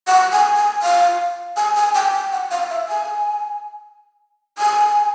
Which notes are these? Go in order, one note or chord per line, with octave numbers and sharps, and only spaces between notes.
F#5
G#5
G#5
F5
G#5
G#5
G5
G5
F#5
F5
E5
G#5
G#5